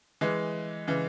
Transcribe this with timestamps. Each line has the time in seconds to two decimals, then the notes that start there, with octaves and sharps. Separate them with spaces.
0.21 E3 G#3
0.87 C#3 E3